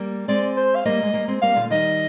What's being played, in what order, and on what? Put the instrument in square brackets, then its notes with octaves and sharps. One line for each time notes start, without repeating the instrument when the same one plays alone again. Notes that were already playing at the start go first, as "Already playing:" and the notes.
Already playing: [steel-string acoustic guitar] G3 A#3
[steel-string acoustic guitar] G#3 C4 [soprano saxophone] D5
[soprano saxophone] C5
F5
[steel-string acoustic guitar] G3 A#3 [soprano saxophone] D#5
[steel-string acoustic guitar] G#3
G3 A#3
G#3 C4
[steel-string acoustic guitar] G3 A#3 [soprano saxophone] F5
[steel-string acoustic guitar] A#2 D3
[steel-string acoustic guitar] D#3 G3 [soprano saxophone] D#5